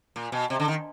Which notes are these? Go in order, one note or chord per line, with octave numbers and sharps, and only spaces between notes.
A#2
B2
C3
D3
D#3